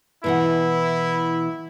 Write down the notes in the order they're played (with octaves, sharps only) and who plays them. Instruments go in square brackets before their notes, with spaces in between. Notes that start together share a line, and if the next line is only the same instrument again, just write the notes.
[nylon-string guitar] B2 E3 F#5 [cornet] E4